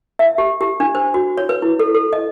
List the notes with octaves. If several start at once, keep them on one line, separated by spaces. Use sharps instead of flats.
E5
G4
G4
D4
C5
F#4
C#5
B4
E4
A4
A4
D#5